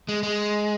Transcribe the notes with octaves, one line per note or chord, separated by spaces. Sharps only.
G#3
G#3